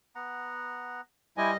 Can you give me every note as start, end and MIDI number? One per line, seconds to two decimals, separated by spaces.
0.15 1.01 59
0.15 1.01 78
0.15 1.01 82
1.37 1.57 55
1.37 1.50 64
1.37 1.54 67
1.37 1.54 71
1.37 1.54 72
1.37 1.57 75
1.37 1.50 80